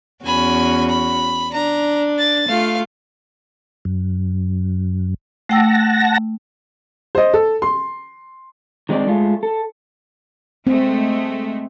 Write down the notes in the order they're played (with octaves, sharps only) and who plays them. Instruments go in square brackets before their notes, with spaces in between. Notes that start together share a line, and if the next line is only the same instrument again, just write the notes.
[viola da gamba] E2 C#4 F#4 [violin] G#5 B5
[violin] B5
[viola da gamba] D4 [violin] A#5
[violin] A6
[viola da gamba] A3 F4 [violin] F5
[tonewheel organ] F#2
[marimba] A3 G5 E6 [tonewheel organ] F#5 A5 A#6
[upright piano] C5 D#5
A4
C6
[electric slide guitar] D#3 G#3 C4 D#4 D5
G#3 A3 F4
A4
[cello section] G#3 A3 [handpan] C4